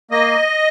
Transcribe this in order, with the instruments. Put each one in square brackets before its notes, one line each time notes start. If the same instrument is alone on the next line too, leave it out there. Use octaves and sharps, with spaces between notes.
[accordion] A#3 D#5